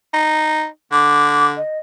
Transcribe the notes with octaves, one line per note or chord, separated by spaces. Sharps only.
D#4
D3 D6
D#5